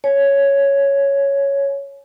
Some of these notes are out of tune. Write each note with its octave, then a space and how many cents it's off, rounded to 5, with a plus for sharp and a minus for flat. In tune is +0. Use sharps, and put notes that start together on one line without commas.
C#5 +0 G#5 +35